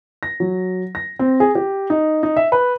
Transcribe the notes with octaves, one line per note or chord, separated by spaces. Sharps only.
A#6
F#3
A#6
C4
G#4
G4
D#4
D#4
E5
B4